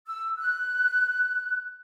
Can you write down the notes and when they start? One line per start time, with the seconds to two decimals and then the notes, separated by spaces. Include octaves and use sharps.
0.06 E6
0.38 F#6